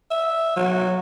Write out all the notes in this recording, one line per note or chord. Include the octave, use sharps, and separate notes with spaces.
E5
F#3